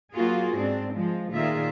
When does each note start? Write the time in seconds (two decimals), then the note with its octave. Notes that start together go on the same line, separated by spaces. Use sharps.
0.13 F#3 A#3 F4 F#4 G#4
0.55 G#2 C4 D4
0.94 F3 G#3
1.33 A#2 D#3 F4 G#4 A#4 E5